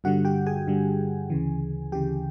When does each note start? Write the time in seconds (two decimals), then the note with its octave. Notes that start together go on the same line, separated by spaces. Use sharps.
0.04 G2 D3 G3 F#4 F#5
0.25 G4 G5
0.46 G#4 G#5
0.67 G2 D3 G3
1.30 D2 C#3 E3
1.92 D2 C#3 E3 G4 G5